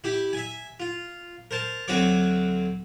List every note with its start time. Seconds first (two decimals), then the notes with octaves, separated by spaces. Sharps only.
0.04 E4 G4
0.33 E5 G#5
0.80 F4
1.51 A#4 C5 A5
1.88 D2 F#3 C4 F#4 C#5 D6